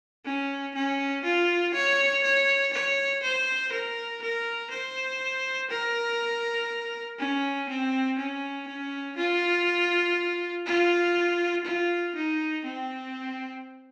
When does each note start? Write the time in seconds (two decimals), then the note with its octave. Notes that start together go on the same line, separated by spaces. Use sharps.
0.25 C#4
0.75 C#4
1.24 F4
1.74 C#5
2.24 C#5
2.73 C#5
3.23 C5
3.72 A#4
4.22 A#4
4.71 C5
5.70 A#4
7.19 C#4
7.69 C4
8.18 C#4
8.68 C#4
9.17 F4
10.66 F4
11.65 F4
12.15 D#4
12.65 C4